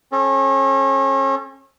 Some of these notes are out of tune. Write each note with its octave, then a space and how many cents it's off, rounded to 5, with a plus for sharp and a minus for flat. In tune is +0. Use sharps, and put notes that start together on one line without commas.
C#4 -35 A4 -35